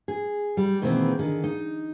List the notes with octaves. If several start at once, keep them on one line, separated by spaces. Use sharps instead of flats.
G#4
G3
B2 D#3 E3 G#3 A#3 C4
D3 D#3 G#4
D#4